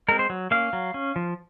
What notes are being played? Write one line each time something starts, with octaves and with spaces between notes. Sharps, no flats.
G#3 C4 A#4
C5
F#3
A#3 C#4 F5
F#3
C#4
F3